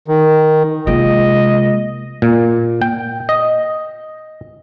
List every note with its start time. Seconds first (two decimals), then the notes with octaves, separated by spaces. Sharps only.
0.08 D#3
0.87 C3 G#3 A#3 F4 D#5
2.22 A#2
2.82 G5
3.29 D#5